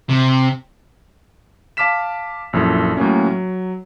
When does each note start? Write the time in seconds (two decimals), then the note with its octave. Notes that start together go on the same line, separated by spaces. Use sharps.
0.09 C3
1.77 F5 A5 D6 F6 B6 E7
2.53 A#1 F#2 E4 A4
2.97 A2 F#3 A#3 C#4
3.26 F#3